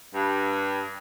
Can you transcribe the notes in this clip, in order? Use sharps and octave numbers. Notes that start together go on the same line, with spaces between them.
G2